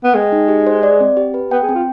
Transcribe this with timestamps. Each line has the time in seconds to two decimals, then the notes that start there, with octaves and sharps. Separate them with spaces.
0.04 B3
0.15 G#3 G5
0.32 D#4
0.48 G4
0.67 C5
0.83 D5
1.00 C4
1.17 G4
1.34 B4
1.51 B3 G5
1.63 G#4
1.69 C4
1.75 F4